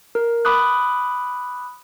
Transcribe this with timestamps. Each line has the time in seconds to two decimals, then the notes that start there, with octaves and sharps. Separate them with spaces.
0.15 A#4
0.45 B5 D6 D#6 F#6